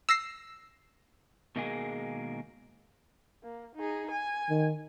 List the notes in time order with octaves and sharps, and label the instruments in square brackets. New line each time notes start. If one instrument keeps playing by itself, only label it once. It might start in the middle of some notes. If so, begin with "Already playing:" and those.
[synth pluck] E6 A#6 C7
[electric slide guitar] B2 D#3 G#3 A#3 G#4
[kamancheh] A#3
D#4 G#4
G#5
[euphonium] D#3